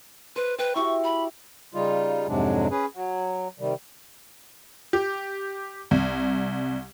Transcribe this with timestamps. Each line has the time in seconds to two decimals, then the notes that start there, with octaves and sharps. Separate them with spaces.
0.36 B4 C5
0.59 B4 G5
0.75 E4 F#4 G4 C#6
1.04 B5
1.74 C#3 G3 D#4 F4
2.28 F2 G#2 C3 F#3 G#3 D4
2.71 C#4 G#4 B4
2.94 F#3
3.59 C3 D#3 G3
4.93 G4
5.91 C2